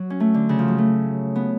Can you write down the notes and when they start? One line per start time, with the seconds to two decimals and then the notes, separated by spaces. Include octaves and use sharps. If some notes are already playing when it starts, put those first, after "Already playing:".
Already playing: F#3
0.10 C#4
0.20 A3
0.34 D3
0.49 C#3
0.59 F3
0.68 F#3
0.78 A3
1.35 B3